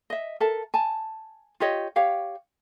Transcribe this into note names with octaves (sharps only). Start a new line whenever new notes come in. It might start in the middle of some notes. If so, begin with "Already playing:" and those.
D#5 E5
A4 A#4 E5 A5
G#5 A5
F4 G4 C#5 D#5
G4 C#5 F5 G5